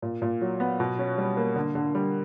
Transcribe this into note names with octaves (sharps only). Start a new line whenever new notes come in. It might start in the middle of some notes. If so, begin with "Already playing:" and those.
A#2
A#2
F#3
B3
B2
C#4
G3
A#3
D3
D3
G3